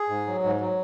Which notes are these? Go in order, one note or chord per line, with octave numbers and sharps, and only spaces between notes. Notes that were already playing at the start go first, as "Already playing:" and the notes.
Already playing: G#4
G#2
F#3
G#2
F#3